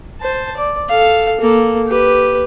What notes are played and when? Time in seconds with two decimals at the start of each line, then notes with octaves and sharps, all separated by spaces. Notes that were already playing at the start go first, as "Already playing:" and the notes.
0.21 C5 A5
0.57 D5
0.90 A4 F5
1.41 A#3 A4
1.87 G4 B4